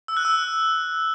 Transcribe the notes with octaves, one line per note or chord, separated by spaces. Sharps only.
E6
F#6
E6